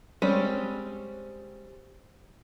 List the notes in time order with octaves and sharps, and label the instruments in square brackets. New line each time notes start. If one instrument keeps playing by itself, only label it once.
[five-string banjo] G3 G#3 C4 C#4 G4